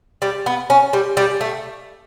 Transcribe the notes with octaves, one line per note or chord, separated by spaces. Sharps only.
G3
B3
C#4
G3
G3
A3